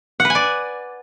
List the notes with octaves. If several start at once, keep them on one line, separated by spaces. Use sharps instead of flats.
F#5
B4
G#5
D5